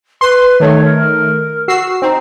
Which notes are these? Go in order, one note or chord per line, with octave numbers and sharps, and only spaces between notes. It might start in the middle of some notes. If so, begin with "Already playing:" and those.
B4 C6
D#3 A3 C#5
A#4
F#4 E6 C7
C4 D#4